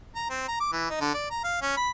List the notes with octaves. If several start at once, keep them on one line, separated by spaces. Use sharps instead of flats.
A#5
C4
A#5
D6
E3
D#4
D3
D5
A#5
F5
C#4
B5